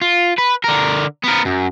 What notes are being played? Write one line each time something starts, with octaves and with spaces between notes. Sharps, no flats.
F4
B4
D3 A#4
B3 A#4
F#2